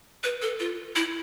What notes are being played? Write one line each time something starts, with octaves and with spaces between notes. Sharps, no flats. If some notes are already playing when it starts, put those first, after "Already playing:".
B4
A4
F4
E4